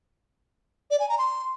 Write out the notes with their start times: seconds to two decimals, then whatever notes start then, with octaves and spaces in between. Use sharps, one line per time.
0.91 D5
1.00 G#5
1.09 A#5
1.18 C6